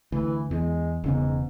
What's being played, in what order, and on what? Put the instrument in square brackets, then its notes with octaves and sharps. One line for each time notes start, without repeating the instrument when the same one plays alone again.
[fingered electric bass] D2 [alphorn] E3
[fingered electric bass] E2 [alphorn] G#3
[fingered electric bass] E1 C#3 B3 [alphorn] G#2